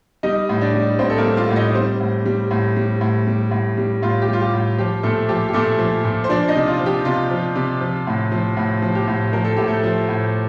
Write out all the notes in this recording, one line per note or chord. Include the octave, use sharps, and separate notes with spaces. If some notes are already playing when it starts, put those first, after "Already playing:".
G3 D#4 D#5
A2
D4 D5
G3
A2 C4 C5
A4
A#3 A#4
G3
F4 F5
A2
D#4 D#5
G3 C4 C5
A2
G3
A2
G3
A2
G3
A2
G3
A2 F4
G4
G3
F4
G4
A2
F3 G4
A#2 A3 A4
F3 G4
G4
A#2 A3 A4
F3
A#2
C5
F3 D4 D5
D#4 D#5
C3
F4
F3
G4
C3 F4
F3
C3
F3
A2
F3
A2
F3
G4
A2
F3 A#4
A4
A2 G4
A3 A4
F3
A2